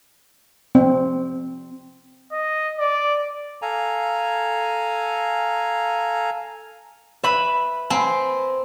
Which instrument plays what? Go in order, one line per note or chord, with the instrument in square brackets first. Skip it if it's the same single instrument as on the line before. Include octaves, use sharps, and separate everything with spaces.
[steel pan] C4
[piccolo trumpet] D#5
D5
[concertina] A4 F5 G#5 A#5
[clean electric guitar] B4 [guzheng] E5 B5
[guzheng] C4 [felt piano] G#5 A#5 B5